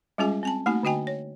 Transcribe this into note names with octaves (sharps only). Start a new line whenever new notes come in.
G3 G#3 C#4 F4 G#4 G#5
C4 G#5 A5
A3 A#3 D#4 F#4 G#5
D3 D4 F#4 D#5 G5 G#5
C#5